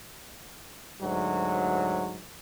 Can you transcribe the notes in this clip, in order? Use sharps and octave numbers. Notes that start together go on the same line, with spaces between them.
D2 G#2 F#3